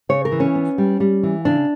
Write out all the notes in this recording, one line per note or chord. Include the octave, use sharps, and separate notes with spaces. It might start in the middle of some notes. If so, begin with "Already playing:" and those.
C#3 C#5
A#4
E3
C#4
B3
G3
G3
E3
C#3 D4